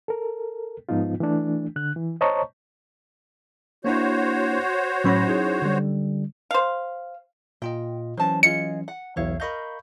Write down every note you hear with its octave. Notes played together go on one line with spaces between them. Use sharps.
A4 A#4
G#2 F3 B3 D#4 F4
E3 A3 D4
D3 F#6
E3
C5 C#5 D#5 A5 A#5 C#6
A#3 D4 E4 F#4 C5 C#5
A2 F#3 C#4 B5 A#6
D#4 E4 G#4
D3 G3
C5 F5
A#2 F4 D#5 G5
E3 F#3 C#4 C5 A5
F4 G#4 D#5 C#7
F#5
B1 E2 E3 E4 C#5 F5
A#4 D#5 F5 B5 C#6 G6